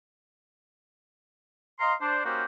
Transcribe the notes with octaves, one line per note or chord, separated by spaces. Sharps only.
D#5 F5 A#5 C6
D4 C5
A#3 C#4 D#4 F#4 G4 C5